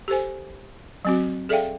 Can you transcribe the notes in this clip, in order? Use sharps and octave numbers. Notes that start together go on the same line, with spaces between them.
G4 A4 C5 G#5
F#3 C4 F#4
G#4 A4 D5 E5 F5 G5